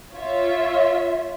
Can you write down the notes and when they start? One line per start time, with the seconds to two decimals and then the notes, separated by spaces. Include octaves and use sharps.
0.13 F4 C#5 E5